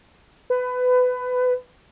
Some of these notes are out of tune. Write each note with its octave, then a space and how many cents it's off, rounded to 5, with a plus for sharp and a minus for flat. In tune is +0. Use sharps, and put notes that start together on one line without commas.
B4 +20